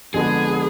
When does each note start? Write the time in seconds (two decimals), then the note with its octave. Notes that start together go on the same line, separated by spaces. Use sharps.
0.14 F2 D3 G#3 B3 G#4